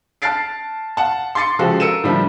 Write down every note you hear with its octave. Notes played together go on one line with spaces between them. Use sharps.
A5 F6 F#6 A6 C7 D7
F5 F#5 A5
C6 D6 A6 C7 C#7
C#3 F3 G#3 F#4 G4 A4
A#4 E6 C#7 D#7 E7
A2 D3 F3 G3 D4